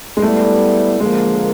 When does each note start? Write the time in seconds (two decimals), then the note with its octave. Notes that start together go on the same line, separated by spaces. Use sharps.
0.17 G#3
0.22 G3 A3 B3 E4 A4 D5
1.00 D3 F3 G#3 A#3